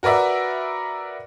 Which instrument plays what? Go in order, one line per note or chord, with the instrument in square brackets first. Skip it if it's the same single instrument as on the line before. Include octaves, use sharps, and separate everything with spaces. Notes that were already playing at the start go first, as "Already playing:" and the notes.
[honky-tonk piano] F#4 A#4 B4 D5 E5